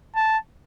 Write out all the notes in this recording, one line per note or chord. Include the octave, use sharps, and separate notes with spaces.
A5